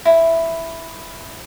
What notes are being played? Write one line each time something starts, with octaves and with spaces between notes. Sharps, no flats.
E4